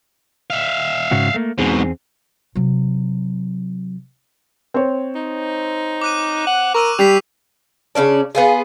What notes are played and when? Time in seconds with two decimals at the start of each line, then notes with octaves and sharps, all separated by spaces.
0.50 E5 F5
1.11 G#2 C#3 F#4
1.34 A3 A#3
1.58 E2 G#2 B2 C4 G#4
2.55 C3 F#3
4.74 C4 C#5
5.15 D#4
6.02 D6 F#6 D#7
6.47 F#5
6.74 A#4 C#6 E6 D#7
6.99 G3 G4 B6 C7 F7
7.95 C#3 B3 C#4 D4
8.35 B3 F4 G#4